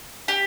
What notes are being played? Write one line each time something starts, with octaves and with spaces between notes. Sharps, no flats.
G4